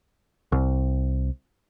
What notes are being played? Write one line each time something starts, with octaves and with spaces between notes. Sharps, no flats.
C2